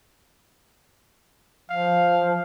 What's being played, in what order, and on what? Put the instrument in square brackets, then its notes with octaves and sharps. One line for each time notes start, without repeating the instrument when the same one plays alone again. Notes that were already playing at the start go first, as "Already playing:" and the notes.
[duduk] F3 [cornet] F5